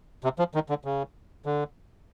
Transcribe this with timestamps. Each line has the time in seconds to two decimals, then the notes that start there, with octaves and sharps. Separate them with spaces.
0.24 C3
0.39 F3
0.54 D#3
0.69 D3
0.85 C#3
1.46 D3